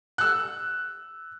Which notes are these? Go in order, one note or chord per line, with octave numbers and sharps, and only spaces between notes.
E6 F#6